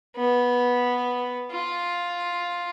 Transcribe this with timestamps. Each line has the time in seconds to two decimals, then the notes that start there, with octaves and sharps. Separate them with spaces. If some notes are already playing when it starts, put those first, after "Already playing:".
0.16 B3
1.51 F4